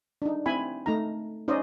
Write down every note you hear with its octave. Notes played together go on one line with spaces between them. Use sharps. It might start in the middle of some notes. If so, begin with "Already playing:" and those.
D4 D#4
C4 E4 G#5 B5
A3 D#4 A#5
C#4 D#4 C5 D5 D#5